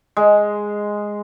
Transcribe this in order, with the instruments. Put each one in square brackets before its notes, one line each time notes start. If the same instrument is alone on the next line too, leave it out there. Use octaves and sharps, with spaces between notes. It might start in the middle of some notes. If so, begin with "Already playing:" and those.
[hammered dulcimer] G#3